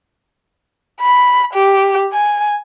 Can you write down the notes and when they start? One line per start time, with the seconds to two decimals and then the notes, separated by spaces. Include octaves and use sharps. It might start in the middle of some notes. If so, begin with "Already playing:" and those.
1.00 B5
1.54 G4
2.12 G#5